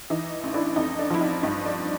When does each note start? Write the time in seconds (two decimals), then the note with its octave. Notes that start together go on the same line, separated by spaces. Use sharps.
0.10 E3 D#4
0.43 A1
0.54 D4 E4
0.76 F2 D#4
0.99 D4
1.10 F3 E4
1.21 D#4
1.43 G2 D#4
1.66 D4